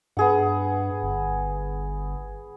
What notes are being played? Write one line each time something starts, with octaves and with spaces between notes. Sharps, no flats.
G2 B3 G#4 F#5
G1